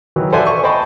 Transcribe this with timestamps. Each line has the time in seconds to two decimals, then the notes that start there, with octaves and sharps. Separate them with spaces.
0.16 D#3 E3 F#3
0.32 A4 C5 D5 E5 F#5 G#5
0.47 C#6
0.63 C5 D#5 G5 A5 B5